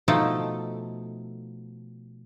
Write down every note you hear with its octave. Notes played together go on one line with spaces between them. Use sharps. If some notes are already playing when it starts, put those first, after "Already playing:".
B2 F3 A3 D#4 A4